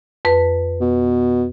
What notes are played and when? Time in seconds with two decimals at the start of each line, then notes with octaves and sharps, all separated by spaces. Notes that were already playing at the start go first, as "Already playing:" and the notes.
0.25 F2 B4
0.81 B2